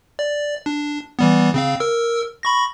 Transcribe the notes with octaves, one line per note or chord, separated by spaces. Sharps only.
D5
D4
E3 G3 B3
C#3 C4 F5
A#4 E6
B5 C#6 A#6